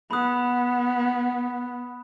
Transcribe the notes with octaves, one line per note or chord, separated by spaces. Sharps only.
B3 B5 D#6 F#6